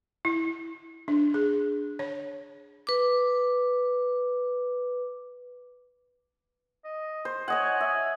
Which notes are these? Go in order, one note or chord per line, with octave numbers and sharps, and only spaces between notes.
E4
D4
G#4
C#5
B4 D6
D#5
C5
C#5 D#5 F#5 G#5
E5